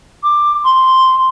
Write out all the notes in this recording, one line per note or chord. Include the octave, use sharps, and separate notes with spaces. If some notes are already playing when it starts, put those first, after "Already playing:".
D6
C6